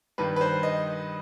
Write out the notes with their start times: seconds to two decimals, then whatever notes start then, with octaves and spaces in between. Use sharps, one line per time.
0.18 G2 D#3 B4
0.36 B4
0.41 C5
0.63 D#5